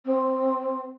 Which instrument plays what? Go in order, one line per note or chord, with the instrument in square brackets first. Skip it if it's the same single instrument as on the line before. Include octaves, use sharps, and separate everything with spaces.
[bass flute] C4